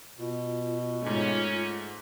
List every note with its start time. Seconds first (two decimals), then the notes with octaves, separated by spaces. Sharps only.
0.19 B2 F4
1.02 G#2 A3 C#4